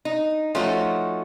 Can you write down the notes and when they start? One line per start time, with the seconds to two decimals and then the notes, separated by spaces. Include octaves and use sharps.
0.05 D#4
0.55 F3 A3 C#4 D#4 F#4